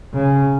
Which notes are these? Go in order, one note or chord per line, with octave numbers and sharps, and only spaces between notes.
C#3